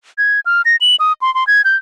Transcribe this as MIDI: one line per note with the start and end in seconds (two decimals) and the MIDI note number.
0.18 0.40 92
0.46 0.62 89
0.65 0.76 94
0.81 0.96 102
1.00 1.13 87
1.22 1.33 84
1.35 1.46 84
1.47 1.62 92
1.65 1.76 91